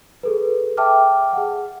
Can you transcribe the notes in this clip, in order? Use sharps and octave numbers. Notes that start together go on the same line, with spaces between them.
G#4 A4 B4
E5 G5 A5 D6 F6
G#4 F#5